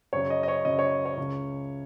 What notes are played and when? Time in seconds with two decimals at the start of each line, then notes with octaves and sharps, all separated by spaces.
0.13 F#2 C#3 C#5
0.30 D#5
0.43 D#5
0.48 C#5
0.65 F#2 C#3 D#5
0.79 C#5
1.05 C#5
1.17 C#2 C#3